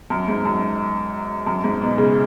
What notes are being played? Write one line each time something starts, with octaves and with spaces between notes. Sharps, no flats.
F#2
G#2
F#2
F#2
G#2
B2
C#3